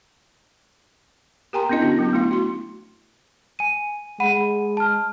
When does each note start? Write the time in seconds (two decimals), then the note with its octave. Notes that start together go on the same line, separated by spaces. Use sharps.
1.53 G4 A#4 G5 G#5 A#5 C6
1.69 B3 C#4 D4 E4 D#5
1.82 D3 D4 F#4
1.99 F#3 B3 D4
2.13 A3 E4 F5
2.31 F#4 C6
3.59 G#5 D#7
4.20 G#3 F#5 B5 D#7
4.77 A5 F6